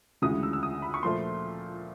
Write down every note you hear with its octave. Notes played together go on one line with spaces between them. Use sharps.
D2 C#3 E3 G#3 D#6
E6
E6
D#6
B5
C#6
A#2 F3 A3 C6